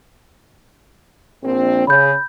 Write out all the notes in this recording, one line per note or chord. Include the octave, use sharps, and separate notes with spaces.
A#1 C4
C#3 B5 G6